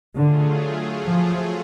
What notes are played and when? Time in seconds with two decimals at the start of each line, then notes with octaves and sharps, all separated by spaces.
0.17 D3 F#3 A3 F4 G#4
1.07 F3